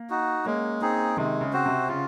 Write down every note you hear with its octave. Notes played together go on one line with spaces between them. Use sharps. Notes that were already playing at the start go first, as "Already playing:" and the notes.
Already playing: A#3
D#4 F#4
G#3 A#3 C#4
C4 D#4 G#4
C3 D#3 G#3
C#3
C4 F#4 C5
C3
C#3 F4